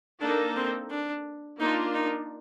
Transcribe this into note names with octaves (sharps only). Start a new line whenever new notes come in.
A#3 D4 D#4 A4
C4
D4
A#3 D4 D#4 F4
D#4